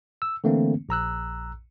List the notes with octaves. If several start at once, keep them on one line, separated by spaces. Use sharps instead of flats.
E6
D3 E3 A3 A#3 C4
A#1 A#5 E6 F#6